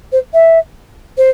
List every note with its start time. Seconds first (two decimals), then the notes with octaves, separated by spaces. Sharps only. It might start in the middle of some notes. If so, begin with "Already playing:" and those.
0.12 C5
0.33 E5
1.17 C5